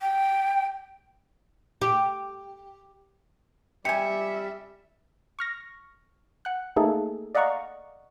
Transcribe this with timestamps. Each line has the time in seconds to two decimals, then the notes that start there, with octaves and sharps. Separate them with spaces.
0.01 G5
1.81 G4
3.85 G3 G4 E5 G#5 C#7
5.39 C#6 F6 A#6
6.45 F#5 F#6
6.76 A3 A#3 D#4 G#4 A4
7.35 D5 D#5 F5 F#5 A#5 C#6